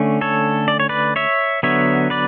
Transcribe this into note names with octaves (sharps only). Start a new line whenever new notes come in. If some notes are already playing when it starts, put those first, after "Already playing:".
Already playing: D3 A3 C#4
A4 C#5
D5
C#5
B4 D5
C#5 E5
D3 F#3 B3 C#5 E5
B4 D5